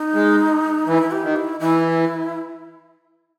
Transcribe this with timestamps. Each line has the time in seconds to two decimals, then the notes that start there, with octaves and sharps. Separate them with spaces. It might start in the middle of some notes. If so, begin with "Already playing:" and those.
Already playing: D#4
0.14 G#3
0.87 E3 E4
1.11 G4
1.24 D#3
1.36 E4
1.60 E3 E4